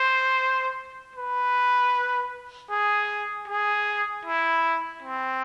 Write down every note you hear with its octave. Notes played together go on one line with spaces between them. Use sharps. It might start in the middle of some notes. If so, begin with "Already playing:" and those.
Already playing: C5
B4
G#4
G#4
E4
C4